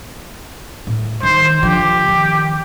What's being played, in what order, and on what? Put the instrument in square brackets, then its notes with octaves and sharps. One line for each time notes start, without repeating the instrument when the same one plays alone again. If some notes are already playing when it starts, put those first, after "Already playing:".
[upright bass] A2
[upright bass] D#3 [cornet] C5
[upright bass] D3 F3 [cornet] G4
[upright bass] D#3